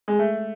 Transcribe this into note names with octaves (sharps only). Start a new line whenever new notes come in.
G#3
A3